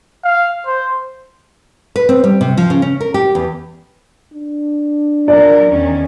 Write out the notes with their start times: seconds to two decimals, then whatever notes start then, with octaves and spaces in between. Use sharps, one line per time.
0.24 F5
0.66 C5
1.96 B4
2.09 C4
2.24 G3
2.41 C3
2.57 F3
2.70 C#3
2.82 C#4
3.01 A#4
3.14 G4
3.35 E2
4.33 D4
5.28 A#2 F#3 A#4 D5
5.70 E2 D#3 C#4